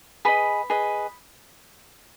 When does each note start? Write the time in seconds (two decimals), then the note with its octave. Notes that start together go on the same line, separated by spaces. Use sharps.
0.25 G#4 B4 D#5 B5 D#6
0.70 G#4 B4 D#5